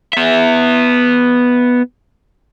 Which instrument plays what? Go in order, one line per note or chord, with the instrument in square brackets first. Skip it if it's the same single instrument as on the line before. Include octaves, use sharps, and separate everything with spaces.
[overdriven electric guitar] B3 E5